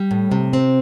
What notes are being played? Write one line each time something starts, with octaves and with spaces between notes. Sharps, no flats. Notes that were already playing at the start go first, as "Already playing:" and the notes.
Already playing: G3
A2
C3
C4